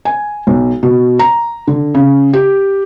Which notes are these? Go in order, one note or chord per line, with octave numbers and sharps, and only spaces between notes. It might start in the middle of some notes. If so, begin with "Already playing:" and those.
G#5
B1
B2
A#5
D3
C#3
G4